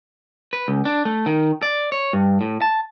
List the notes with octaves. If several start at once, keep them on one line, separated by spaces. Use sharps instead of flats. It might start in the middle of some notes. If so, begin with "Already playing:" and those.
B4
C#2
D4
A3
D#3
D5
C#5
G2
A2
A5